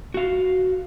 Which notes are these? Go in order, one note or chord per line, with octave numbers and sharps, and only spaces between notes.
F#4 F5